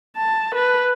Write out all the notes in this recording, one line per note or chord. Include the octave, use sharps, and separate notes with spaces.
A5
B4